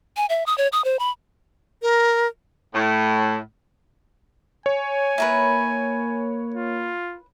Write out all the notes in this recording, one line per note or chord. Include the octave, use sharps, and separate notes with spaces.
G#5
E5
D#6
C#5
D#6
C5
B5
A#4
A2
C#5 G#5
A#3 E4 A#4 B4
F4